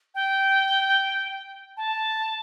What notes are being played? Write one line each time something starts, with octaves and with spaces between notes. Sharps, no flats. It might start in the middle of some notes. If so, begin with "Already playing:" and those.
G5
A5